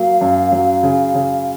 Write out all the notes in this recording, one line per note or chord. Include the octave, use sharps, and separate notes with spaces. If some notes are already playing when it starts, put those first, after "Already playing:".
Already playing: F#3 A#3 F5
F#2
F#3
C#3
C#3